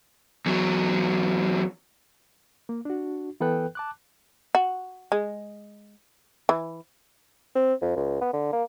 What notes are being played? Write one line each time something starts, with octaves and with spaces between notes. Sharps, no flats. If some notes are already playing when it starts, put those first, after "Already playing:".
E2 F#3
A#3
D4 F#4
E3 B3 A4 B4 G5 F#6
A5 D6 F#6
F#4
G#3
E3
C4
F2
C#2
B3
D3
A#3